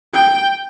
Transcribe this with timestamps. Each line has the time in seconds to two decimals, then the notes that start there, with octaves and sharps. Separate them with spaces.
0.14 G5